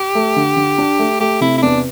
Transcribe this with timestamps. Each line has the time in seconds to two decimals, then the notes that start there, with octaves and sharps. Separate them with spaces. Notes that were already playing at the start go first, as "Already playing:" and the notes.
Already playing: G4
0.15 A3
0.36 D3
0.56 D3
0.78 D4
0.99 A3
1.20 A3 G4
1.41 C3 E4
1.58 E4
1.62 E2 D4